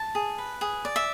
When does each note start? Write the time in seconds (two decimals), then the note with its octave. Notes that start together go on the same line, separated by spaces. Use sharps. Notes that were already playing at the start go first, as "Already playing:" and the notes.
Already playing: A5
0.15 G#4
0.38 B4
0.61 G#4
0.85 D5
0.96 E5